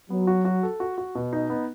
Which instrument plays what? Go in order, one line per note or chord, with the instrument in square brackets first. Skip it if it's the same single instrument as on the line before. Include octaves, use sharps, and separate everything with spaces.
[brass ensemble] F#3 [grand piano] B3
[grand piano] F#4
F#4
A4
F#4
F#4
B2
D#4
B3